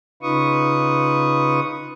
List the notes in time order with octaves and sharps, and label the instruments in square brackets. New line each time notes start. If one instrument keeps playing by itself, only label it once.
[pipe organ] C#3 D#4 F4 B4 C#6 D#6